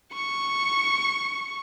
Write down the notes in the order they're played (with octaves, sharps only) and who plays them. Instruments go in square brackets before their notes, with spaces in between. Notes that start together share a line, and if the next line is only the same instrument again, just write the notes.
[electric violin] C#6 C#7